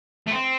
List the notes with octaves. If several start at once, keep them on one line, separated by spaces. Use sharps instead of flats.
A3
C4